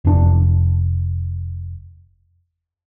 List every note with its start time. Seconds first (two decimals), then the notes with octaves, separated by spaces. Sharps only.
0.05 F1 D4